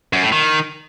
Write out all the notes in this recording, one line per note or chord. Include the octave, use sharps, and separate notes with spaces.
F#2
A2
D#3